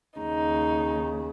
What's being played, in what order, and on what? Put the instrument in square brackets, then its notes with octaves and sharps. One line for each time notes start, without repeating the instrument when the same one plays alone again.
[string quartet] D#2 C#3 D#4